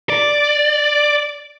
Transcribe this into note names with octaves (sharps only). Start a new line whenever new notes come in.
D5